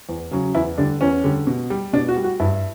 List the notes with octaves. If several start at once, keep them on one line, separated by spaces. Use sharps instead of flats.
E2
C#3 F#3
E2 E4
D3 G3 D4
E2 C#4
D3 G3
B2
G3
B2 D4
F#4
G3
F#4
G2 E4